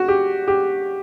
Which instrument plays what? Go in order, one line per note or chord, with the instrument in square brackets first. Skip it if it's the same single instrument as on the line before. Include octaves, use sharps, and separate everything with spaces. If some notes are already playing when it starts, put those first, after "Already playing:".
Already playing: [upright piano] F#4
G4
G4